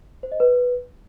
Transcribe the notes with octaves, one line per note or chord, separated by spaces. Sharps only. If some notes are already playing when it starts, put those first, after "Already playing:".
C5
D#5
B4